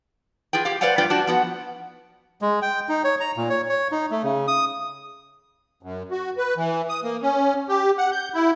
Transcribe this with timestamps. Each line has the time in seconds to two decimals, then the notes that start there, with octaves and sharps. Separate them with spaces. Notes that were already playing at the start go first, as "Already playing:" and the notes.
0.53 F4 G#4 B4 G5
0.65 G4 F5
0.81 B4 C5 D5 F5 F#5 G#5
0.98 G2 F4 B4 D5 G5
1.10 D4 F#4
1.27 F3 B3 F#4
2.42 G#3
2.62 G5
2.89 D#4
3.04 C#5
3.20 A#5
3.37 A#2
3.50 C#5
3.69 C#5
3.92 D#4
4.11 A3
4.24 C#3
4.48 D#6
5.83 F#2
6.11 F#4
6.38 B4
6.57 E3
6.89 D#6
7.04 A#3
7.22 C#4
7.69 G4
7.98 F#5
8.12 G6
8.34 E4